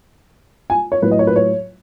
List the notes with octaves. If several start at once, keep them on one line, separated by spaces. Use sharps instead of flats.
G#5
C#5
A2 F#3 B4
D#5
C#5
B4
C#5